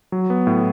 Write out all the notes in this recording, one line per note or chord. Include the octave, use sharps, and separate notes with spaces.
F#3
B3
A2